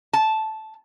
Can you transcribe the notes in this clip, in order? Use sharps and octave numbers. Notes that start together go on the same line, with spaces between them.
A5